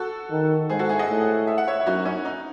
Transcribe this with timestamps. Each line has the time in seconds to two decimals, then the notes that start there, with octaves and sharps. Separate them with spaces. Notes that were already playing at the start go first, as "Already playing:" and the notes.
Already playing: F#4 A4
0.31 D#3
0.69 G#2 G#4 C5
0.79 F#4 A4
0.89 E4 G#4
0.99 D#5 F#5
1.09 A2
1.47 E5
1.58 F#5
1.68 C#5 E5
1.80 E4
1.86 F#2 D#4 F#4
2.05 C#4 E4
2.25 D#4